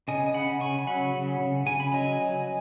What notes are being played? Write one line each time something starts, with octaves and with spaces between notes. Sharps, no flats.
C#3 D#5 G#5
C#3 F#5 B5
C#3 G#5 C#6
F#3 F#5 B5
C#3
C#3
C#3 G#5
B5
F#3 D#5 G#5
F#3